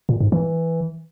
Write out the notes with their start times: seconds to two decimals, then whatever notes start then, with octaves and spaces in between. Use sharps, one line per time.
0.09 A#2
0.20 G#2
0.32 E3